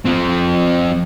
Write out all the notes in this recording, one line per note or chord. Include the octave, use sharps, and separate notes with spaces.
F3 C4